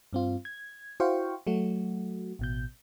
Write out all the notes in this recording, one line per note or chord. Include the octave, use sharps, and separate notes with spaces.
G2 C4 F4
G#6
E4 F#4 C5 F5 G5 C#6
F#3 A3 F#4
A1 B2 G6